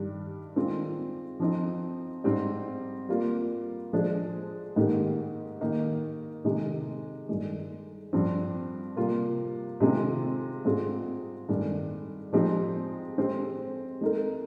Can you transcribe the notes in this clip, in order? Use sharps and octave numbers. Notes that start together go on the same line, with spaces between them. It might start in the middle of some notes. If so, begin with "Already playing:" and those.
Already playing: G2 D#3 G3
D#3 G#3 C4 F4
F3 C4 D#4
G#2 G3 C4 D#4
G3 A#3 F4
F3 G#3 D4 G#4 C5
G#2 D#3 A#3 D#4 G4
D#3 A#3 D#4
C3 D#3 G#3
G2 D#3 G#3
G2 F3 C4
C3 G3 A#3 F4
C3 D#3 G#3 C4 F4
G#2 G3 C4 F4 G#4
G2 D#3 G#3
F3 G#3 C4 D#4 G4
G#3 C4 G4 C5
G#3 D#4 A#4